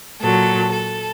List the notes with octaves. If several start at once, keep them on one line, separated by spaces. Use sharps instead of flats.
A#2 F#3 A4
A4